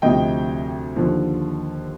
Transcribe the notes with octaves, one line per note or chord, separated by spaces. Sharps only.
D2 C3 F3 D#5 G5
D#2 D3 F3